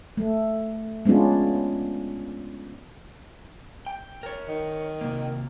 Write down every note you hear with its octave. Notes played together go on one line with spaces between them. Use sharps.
A3
G#3 B3 C#4 D4 F4
G5
A#4 C#5
D#3
C3 A#3